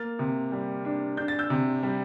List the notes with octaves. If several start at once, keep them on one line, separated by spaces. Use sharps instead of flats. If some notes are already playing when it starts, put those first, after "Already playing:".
Already playing: A#3 F6 A6
C3
G3
D4
D4 G6
A6
E6 G6
C3
G3